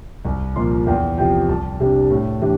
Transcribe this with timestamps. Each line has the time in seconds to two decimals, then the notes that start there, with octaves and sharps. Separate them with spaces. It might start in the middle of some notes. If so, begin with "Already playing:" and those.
0.25 C2
0.56 A#2 F3 C6
0.87 E2 G5
1.18 C3 F3 G5
1.49 C2 A5
1.80 C3 G3 D4
2.10 A2
2.42 E3 G3 D4